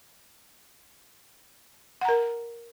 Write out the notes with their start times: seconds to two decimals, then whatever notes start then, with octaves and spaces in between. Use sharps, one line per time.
2.01 F#5
2.05 A#5
2.09 A#4